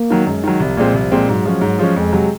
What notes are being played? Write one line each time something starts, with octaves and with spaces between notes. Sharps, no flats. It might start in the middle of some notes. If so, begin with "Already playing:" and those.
Already playing: A#3
D#3 F#3
F#2 G#3
D#3 F#3
C2 F3
A#2 G#3 C4
C2
A#2 G#3 C4
G#2 F#3
F3 G#3 C#4
G#2
F3 G#3 C#4
F2 G#3
C3 F#3